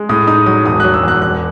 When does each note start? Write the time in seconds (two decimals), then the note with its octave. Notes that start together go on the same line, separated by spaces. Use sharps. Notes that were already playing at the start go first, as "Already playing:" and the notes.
Already playing: G#3
0.09 A2 D#6
0.27 D#4 D#6
0.46 F#3 D#6
0.65 E1 D#6
0.80 F#3 F#6
0.94 E6
1.03 E2 F#6
1.22 E1 F#6